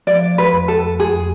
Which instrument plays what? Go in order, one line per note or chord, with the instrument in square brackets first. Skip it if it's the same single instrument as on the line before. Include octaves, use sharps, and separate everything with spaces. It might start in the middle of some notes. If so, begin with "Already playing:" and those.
[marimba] F3 [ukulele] D5
[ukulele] B4
[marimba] F2
[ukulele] A4
[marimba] F2 [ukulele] G#4